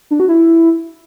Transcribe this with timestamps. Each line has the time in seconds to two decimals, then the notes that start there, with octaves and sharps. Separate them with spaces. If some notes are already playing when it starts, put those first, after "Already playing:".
0.11 D4
0.20 F#4
0.29 E4